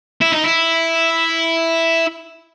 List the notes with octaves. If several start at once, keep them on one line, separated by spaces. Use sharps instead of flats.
E4
D#4
E4